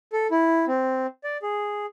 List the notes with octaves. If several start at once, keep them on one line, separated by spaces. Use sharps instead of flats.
A4
E4
C4
D5
G#4